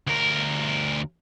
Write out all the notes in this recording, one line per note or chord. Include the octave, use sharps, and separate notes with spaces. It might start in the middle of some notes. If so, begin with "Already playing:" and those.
D2 A#4